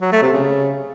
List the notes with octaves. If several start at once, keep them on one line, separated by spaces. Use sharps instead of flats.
F#3
A3
C3
C#3